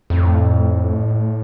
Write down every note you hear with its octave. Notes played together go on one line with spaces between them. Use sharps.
F2 A2